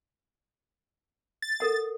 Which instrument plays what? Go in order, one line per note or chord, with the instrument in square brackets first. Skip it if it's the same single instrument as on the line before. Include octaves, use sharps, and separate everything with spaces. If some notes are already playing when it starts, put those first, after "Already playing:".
[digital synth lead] A6
[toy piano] A4 A#4 F#5